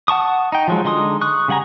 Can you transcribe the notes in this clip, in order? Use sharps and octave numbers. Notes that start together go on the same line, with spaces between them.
F#5 A5 C#6 D#6
D#4 G5
F3 F#3 G#3
D3 G#3 D#4 C6 D#6
C#6 D#6 F#6
C#3 G3 F#5 G#5 A#5